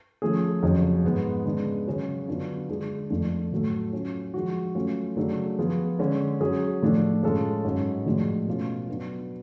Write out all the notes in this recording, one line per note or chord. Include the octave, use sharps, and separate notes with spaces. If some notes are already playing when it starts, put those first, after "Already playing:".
F3 A3 C#4 G#4
F2 C#3 F#3 C#4
G#2 G#3 B3
C#3 G#3 B3 D4
C#3 F#3 C#4 F#4
D3 F#3 B3 D4 F4
D3 G#3 D4 F4 G#4
F2 F3 A3 D4
A2 F#3 A3
F#3 C#4 F4
F3 G#3 D4 F#4
F#3 A3 C#4 F4
C#3 F#3 A3 D4
F3 B3 F4 G#4
D3 G#3 C#4
F#3 C#4 G#4
A2 F3 A3 D4 F4
A2 G#3 C#4 F4 A4
G#2 F#3 C#4
A2 F3 G#3 D4 F#4
B2 A3 C#4 F4
F#3 B3 D4